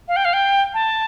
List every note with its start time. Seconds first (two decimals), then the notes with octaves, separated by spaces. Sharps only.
0.08 F5
0.16 G5
0.25 F5
0.33 G5
0.74 A5